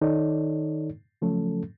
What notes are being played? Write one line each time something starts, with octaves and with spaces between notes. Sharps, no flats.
D#3 D#4 A4 C#5 D5
C#3 F3 F#3 A3 C#4 A4